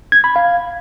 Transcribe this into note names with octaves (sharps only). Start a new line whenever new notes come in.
G#6
B5
F5